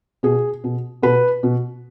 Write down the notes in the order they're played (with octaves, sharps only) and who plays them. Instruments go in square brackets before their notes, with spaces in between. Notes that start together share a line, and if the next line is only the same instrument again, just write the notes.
[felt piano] B2 G#4
B2
B2 B4
B2